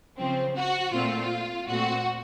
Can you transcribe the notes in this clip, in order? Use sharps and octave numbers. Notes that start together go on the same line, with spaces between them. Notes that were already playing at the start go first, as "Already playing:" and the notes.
C#3 F3 C4
F#4
A#2 A3 C4 F4
A#2 A3 C4 F#4